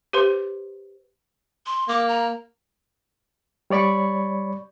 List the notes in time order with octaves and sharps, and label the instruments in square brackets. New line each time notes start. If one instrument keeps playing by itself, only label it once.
[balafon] G4 B4 C5 C6
[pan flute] C6
[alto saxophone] A#3 [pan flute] D6
[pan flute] A#5
[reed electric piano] G3 C#5 D5 B5 C#6